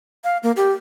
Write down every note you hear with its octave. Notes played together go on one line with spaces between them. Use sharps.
F5
A#3
G4